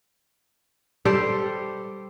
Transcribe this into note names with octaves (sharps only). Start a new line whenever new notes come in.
G3 G4 A4 C5